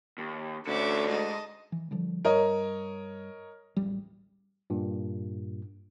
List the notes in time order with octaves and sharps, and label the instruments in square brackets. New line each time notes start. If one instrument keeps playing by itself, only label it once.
[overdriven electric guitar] D#2
[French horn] D2 [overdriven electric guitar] D3 C#4 [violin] E5 D6
[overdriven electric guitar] G#2 [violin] D#5 A5
[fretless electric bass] E3
D3 F3 G3
[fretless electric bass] G2 [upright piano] A#4 C#5 D#5
[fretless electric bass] D1 A1 G3
[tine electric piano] G2 A#2